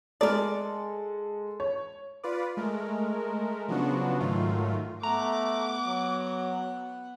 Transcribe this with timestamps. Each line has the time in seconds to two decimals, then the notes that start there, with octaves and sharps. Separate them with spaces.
0.21 G#3 A4 A#4 D5
1.60 C#5
2.23 F4 B4 D5
2.57 G#3 A3 A#4
3.68 C#3 F3 F#3 B3 D4 F#4
4.20 G#2 D#3 F#3 A3 F4
5.03 A3 B3 F#5 A#5 D6
5.86 F#3